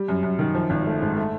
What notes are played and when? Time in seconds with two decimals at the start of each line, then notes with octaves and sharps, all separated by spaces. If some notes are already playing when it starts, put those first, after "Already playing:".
Already playing: G3
0.08 F#2
0.23 F#2
0.39 D#3
0.55 F3
0.70 G#1
0.86 A3
1.02 G#2
1.17 A3